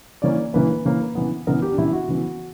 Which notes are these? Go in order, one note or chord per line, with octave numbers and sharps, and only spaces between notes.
C#3 E3 A#3 C#4 D5
C#3 E3 A#3 C#4 B4
C#3 E3 A#3 C#4
C#3 E3 B3
C#3 E3 B3 A#4
G4
D4
C#3 E3 B3 E4
F#4
C#3 E3 B3